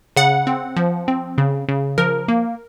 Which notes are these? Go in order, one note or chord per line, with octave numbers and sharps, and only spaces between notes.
C#3 F#5
C4
F3
C4
C#3
C#3
F3 A#4
A#3